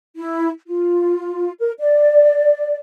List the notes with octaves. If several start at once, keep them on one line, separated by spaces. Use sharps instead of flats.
E4
F4
A#4
D5